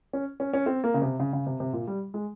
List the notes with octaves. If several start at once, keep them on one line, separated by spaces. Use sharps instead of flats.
C#4
C#4
C#4
C4
A#3
C#3
C3
C#3
C#3
C3
C3
A#2
G3
G#3